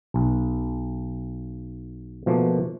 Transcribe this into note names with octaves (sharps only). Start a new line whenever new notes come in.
B1
B2 F3 A3 A#3